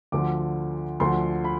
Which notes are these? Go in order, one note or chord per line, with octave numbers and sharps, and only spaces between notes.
D2 D3 F3 D6
D2 D3 F3 C6
B5